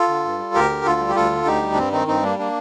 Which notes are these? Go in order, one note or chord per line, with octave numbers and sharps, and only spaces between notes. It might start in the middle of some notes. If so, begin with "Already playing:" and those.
Already playing: F4 A4
D3
G2
G3
D2 G4 A#4
D3
D2 F4 A4
G3
G4
D2 F4 A4
D3
D2 D#4 G4
G3
D4
G2 C4
D#3 C4 D#4
G2 C4 D#4
G3 A#3 D4
A#3 D4